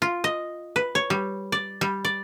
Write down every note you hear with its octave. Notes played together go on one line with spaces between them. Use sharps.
F4
D#5
B4
C#5
G3
D5
G3
D5